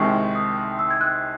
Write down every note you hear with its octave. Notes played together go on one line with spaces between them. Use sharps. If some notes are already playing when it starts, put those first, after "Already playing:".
Already playing: C2 C3 D#3 G#3 C#6
D#6
E6
G#6
F#6